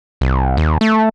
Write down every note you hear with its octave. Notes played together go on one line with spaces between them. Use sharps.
C2
D#2
A3